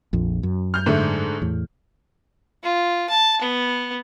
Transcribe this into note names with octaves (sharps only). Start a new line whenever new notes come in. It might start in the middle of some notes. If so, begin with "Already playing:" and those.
A#1 F2
F#2
F6 G6
G#2 D3 A3
E2 A2
F4
A5
B3